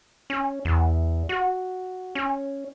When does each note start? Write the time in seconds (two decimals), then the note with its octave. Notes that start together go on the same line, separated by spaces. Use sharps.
0.30 C#4
0.65 E2
1.29 F#4
2.15 C#4